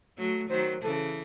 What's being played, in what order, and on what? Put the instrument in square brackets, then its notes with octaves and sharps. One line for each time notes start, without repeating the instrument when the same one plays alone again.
[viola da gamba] F#3 A3
[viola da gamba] D#3 F#3 [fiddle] C5
[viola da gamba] C#3 E3 [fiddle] A4